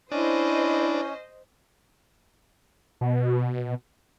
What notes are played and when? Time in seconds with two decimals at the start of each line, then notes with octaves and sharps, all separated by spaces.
0.12 C#4 D4 E4 C5 D#5
3.01 B2